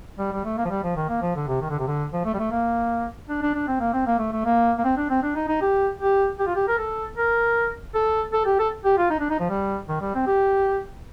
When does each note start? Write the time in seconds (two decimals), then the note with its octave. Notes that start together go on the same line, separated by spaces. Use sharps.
0.19 G3
0.32 G3
0.45 A3
0.58 A#3
0.65 F3
0.70 G3
0.83 F3
0.96 D#3
1.09 A#3
1.22 F3
1.36 D3
1.48 C3
1.61 D#3
1.70 D3
1.79 C3
1.88 D3
2.13 F3
2.25 A3
2.34 G3
2.39 A3
2.51 A#3
3.29 D4
3.42 D4
3.55 D4
3.68 C4
3.80 A#3
3.93 C4
4.06 A#3
4.19 A3
4.33 A3
4.45 A#3
4.78 A#3
4.84 C4
4.97 D4
5.10 C4
5.23 D4
5.36 D#4
5.48 D#4
5.61 G4
6.01 G4
6.39 G4
6.47 F4
6.55 G4
6.68 A#4
6.78 A4
7.17 A#4
7.95 A4
8.33 A4
8.46 G4
8.59 A4
8.85 G4
8.98 F4
9.10 D#4
9.20 D4
9.30 D#4
9.40 F3
9.50 G3
9.89 D#3
10.01 G3
10.14 C4
10.27 G4